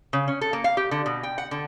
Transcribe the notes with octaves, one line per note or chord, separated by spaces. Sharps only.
C#3
C#4
A4
A#3
F5
G4
D3
B2
G5
F#5
D3